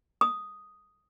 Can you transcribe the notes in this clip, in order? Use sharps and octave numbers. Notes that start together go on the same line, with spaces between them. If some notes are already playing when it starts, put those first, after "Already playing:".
D#6